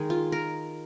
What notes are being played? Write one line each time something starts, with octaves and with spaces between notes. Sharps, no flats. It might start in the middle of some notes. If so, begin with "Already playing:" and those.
Already playing: D#3 G#3 G#4
F4
A#4